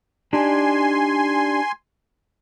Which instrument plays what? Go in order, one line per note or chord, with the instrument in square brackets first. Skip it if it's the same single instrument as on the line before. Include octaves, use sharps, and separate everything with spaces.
[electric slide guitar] D4 D#4 G4 [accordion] G#5 C6